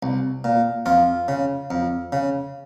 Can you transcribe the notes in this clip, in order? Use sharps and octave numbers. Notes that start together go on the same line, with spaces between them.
C2
A#2
F2 F4
C#3
F2
C#3